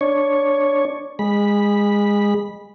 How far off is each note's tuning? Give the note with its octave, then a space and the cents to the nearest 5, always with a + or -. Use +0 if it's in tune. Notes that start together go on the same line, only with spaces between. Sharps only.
D4 +0 C#5 +0
G#3 -20 B5 -10